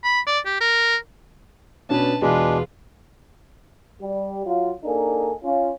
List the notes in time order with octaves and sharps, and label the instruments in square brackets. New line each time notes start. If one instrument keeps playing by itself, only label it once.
[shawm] B5
D5
G4
A#4
[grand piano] B2 C#4 D4 [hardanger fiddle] B4 A5
[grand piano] E2 B2 [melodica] G#3 D4 [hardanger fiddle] F4 B4 [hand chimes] G#4
[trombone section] G3
F#3 F4
A#3 D4 D#4 G#4 A4
C#4 F4